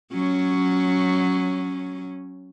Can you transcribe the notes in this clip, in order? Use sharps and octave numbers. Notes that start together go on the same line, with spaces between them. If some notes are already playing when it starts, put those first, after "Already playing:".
F#3 C#4